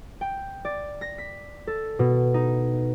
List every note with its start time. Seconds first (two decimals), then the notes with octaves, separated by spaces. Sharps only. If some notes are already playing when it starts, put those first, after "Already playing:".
0.21 G5
0.65 D5
1.01 A#6
1.18 B6
1.67 A4
1.99 B2
2.34 D#4